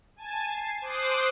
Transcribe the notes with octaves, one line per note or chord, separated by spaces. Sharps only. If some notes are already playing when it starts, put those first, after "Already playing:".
G#5 A5
C7
C5 D6 D#6 F#6 C7